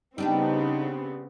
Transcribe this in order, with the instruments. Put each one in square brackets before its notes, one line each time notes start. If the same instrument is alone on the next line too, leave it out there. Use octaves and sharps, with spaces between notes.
[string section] C#3 B3 C4 [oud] G3 D4 G4 [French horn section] D#4